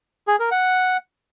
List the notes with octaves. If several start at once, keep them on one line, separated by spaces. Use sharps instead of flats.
G#4
A#4
F#5